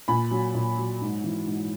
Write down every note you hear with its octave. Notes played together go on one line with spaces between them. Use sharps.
A#2 G#5 B5
F#3
A#2
F#3
G#2
E3
G#2